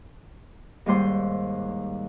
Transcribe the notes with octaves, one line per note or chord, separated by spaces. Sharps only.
D#2 G#2 G3 C5 C6